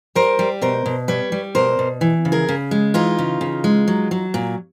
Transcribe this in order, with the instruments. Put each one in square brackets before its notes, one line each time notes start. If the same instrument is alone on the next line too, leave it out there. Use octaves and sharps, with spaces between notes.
[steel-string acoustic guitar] G3 A#4 C5
G3
B2 A#4 C5
B2
G3 B4 C#5
G3
B2 A#4 C5
B2
E3
C#3
G#4 A#4
C#3
G#3
E3 D#4 F4
C#3
C#3
G#3
F#3
F#3
A#2